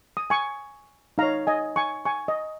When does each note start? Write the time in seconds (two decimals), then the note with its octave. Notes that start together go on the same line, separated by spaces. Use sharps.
0.17 D#6
0.30 G#5 C#6
1.18 D#4 C#5 F5 A#5
1.47 D#5 G#5
1.76 G#5 C#6
2.05 G#5 C#6
2.28 D#5